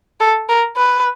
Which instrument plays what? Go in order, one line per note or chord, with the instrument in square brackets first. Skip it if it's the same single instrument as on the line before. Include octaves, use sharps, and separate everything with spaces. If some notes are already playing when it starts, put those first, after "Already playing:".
[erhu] A4
A#4
B4